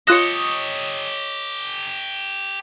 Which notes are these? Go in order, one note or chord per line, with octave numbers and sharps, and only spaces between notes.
F4 G4 A4 C#5 D#5 F#6 A#6